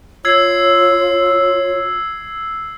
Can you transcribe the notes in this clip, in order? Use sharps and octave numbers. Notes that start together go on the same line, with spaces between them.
F4 C#5 E6 G#6 C7